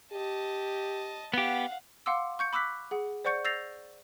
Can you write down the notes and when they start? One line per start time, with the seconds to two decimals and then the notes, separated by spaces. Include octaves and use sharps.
0.13 G4 D#5 A5
1.34 B3 G4 F5 F#5
2.06 F5 F#5 C6 D6 E6
2.39 C#6 G6 C#7
2.53 B5 D6 E6 F#6 B6
2.91 G#4 F#5
3.25 C5 D5 F#5 C#6 G6 C#7
3.45 E6 G6 A6 A#6 C7 F7